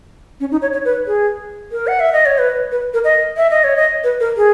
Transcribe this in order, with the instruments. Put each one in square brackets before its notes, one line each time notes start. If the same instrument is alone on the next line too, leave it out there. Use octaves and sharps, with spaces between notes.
[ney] C#4
D#4
C#5
C#5
B4
G#4
A#4
F#5
E5
D#5
C#5
B4
B4
A#4
D#5
E5
D#5
C#5
D#5
B4
A#4
G#4